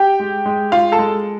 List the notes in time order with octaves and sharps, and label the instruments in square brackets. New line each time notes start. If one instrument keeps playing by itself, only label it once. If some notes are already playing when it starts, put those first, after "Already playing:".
Already playing: [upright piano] G4 G5
G#3
G#3
G#3 F4 F5
A4 A5
G#3